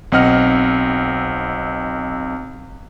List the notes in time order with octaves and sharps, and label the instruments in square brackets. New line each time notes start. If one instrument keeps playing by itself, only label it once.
[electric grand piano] B1 C4 D#5 F#5 F6